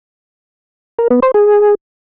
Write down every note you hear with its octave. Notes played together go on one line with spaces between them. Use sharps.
A#4
B3
C5
G#4